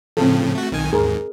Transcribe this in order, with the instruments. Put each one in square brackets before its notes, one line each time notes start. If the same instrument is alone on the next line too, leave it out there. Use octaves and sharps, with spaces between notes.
[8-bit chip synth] A2 C#3 F3 [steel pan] C4 A4
[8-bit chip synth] A3 F#4
B1 D#3 G#5
[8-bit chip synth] D#2 G#2 [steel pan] G#4 A#4